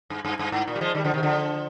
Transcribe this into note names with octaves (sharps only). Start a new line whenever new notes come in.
G2
G2
G2
G#2
A#2
G3
F3 G#3
D#3 G3
D3 F3
C3 D#3
D3 F3